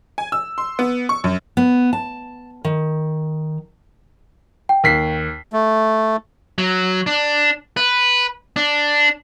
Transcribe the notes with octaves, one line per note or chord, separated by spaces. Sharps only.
G#5
E6
C6
B3
C#6
F#2
B3
A5
D#3
G5
D#2 B6 C7
A3
F#3
D4
B4
D4